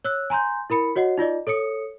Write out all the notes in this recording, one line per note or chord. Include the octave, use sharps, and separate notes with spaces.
C#5 E6 F#6
G#5 A#5 C6 G6
E4 A#4 B5 C#7
F#4 C#5 D#5 F#5 C7
D#4 F4 D5 D#5
A4 C#5 D#6 C#7